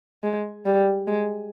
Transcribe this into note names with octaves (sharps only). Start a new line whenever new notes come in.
G#3
G3
G#3